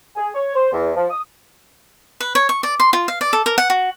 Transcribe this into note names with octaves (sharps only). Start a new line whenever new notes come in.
G#4
C#5
C5
E2
F3
D#6
B4
C#5
C#6
D5
C6
F4
F5
D5
A4
A#4
F#5
F#4